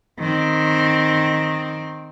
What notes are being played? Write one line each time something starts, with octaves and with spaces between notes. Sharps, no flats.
D#3 C4